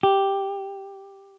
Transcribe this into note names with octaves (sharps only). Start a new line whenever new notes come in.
G4